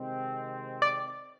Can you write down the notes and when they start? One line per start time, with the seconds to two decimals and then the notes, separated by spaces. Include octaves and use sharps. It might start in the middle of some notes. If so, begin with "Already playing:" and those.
Already playing: C3 D#3 G#3 C4
0.82 D5